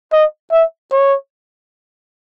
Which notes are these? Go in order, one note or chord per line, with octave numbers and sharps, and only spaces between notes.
D#5
E5
C#5